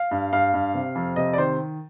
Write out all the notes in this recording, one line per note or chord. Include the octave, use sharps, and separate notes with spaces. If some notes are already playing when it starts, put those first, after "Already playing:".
Already playing: F5
G2
G2 F5
G2
C3
F2
C3 D#5
D5
D#3 C5